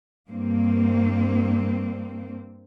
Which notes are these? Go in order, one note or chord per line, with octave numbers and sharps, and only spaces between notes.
G2 A#3 C4